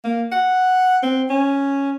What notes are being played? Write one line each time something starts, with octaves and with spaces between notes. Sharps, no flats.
A#3
F#5
C4
C#4